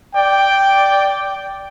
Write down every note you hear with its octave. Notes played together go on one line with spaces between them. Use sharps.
D5 G5